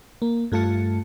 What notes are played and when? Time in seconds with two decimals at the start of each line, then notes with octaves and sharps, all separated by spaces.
0.22 A#3
0.52 G2 A3 F4 A5 C#7